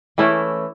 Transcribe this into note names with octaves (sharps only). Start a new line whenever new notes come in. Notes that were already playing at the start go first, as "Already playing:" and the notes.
E3 A3 C#4 E4